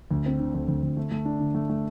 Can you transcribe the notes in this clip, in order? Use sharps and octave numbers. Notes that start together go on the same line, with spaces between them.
D2
C4
D3
D2
D2
D2
A3
A3
D4
D3
A3
A3